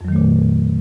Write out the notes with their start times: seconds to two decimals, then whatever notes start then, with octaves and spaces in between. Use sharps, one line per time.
0.01 F2
0.05 F#3
0.08 D#3
0.12 A3
0.16 A#2